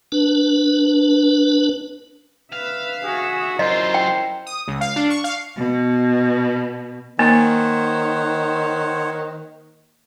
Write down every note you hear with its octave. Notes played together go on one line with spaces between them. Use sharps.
D4 B4
B4 E5 F5
F#4 G#4 E5
F#2 E4 F4 A#4 C5 D#5
G5
D#6
C#2
F5
D4
C#6
F5
B2
D#3 A#3 C5 C#5 F#5